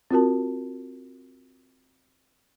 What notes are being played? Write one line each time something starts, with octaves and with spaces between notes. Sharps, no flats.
C4 F4 F#4 A#4 A5